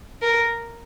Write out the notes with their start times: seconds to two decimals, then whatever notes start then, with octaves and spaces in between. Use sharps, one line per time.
0.22 A#4